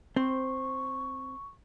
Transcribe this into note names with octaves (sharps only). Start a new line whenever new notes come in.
C4 C5 C#6